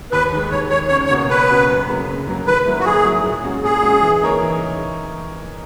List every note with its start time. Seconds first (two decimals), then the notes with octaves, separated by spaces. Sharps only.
0.12 D#2 B4
0.32 D#3 G#3
0.51 D#2 C#5
0.70 D#3 G#3 C#5
0.88 C#2 C#5
1.06 C#5
1.10 B2 A#3 C#4 F#4
1.30 C#2 B4
1.49 B2 A#3 C#4 F#4
1.68 F#2
1.88 C#3 F#3 A#3
2.08 F#2
2.27 C#3 F#3 A#3
2.47 D#3 B4
2.66 F#3 A#3 E4
2.79 F#4
2.85 D#3 G#4
3.05 F#3 A#3 E4
3.25 A#2
3.44 G#3 C#4 F#4
3.64 A#2 G#4
3.83 G#3 C#4 F#4
4.02 E3
4.22 A#3 D#4 A#4 C#5
4.42 E3